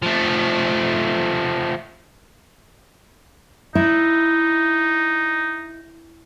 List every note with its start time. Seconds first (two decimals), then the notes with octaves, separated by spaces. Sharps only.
0.03 F3 A3
3.75 D#4 E4